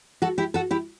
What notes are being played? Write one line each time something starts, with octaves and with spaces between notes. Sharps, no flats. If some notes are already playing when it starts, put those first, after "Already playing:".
F#4 A4
E4 G4
F#4 A4
E4 G4